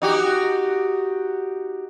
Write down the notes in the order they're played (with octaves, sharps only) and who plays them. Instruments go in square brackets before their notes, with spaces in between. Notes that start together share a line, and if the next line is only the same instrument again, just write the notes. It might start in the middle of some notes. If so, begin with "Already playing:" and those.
[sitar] D#4 F#4 G4